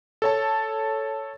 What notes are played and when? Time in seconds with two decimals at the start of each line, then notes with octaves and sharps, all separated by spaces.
0.22 A4 C#5 A5